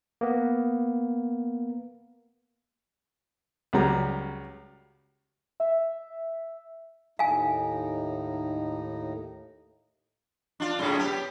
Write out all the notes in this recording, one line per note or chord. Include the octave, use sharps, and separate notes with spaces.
A#3 B3
C#2 C#3 F#3 G3 A#5
E5
D#2 A2 D#4 F5 G#5
D4 F4
F#2 A2 C#3
B3 G4